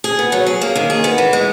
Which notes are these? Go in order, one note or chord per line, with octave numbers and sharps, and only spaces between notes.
G#4
B3
F#3
G#4
A#3
D#3
G#4
B3
E3
G#3